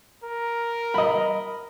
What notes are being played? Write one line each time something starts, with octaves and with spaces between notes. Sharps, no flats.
A#4
D#5 B5